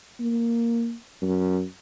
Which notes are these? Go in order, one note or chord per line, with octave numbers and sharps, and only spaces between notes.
A#3
F#2